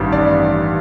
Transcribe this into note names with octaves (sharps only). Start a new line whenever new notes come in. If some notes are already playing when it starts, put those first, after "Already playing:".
Already playing: A1 G2 D#3 G3
D5